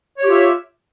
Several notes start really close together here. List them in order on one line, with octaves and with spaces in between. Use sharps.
C#5 G4 F4 E5